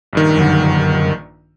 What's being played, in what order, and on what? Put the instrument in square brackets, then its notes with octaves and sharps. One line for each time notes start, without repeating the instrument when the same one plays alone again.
[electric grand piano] A#1 G2 D#3
[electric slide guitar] F#2 D3